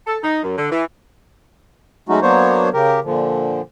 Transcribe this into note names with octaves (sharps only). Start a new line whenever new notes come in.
A4
D#4
F#2
D3
E3
F#3 G#3 A3 C#4 D#4 F#4
F#3 A#3 B3 D4 C5 C#5
C#3 G4 A#4
A#2 D3 F3